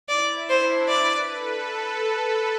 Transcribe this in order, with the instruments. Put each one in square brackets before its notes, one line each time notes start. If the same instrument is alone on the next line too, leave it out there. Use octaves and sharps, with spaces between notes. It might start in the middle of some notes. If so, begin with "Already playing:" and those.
[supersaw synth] E4 [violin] D5
[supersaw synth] D4 [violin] C5
[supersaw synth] B4 [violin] D5
[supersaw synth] A4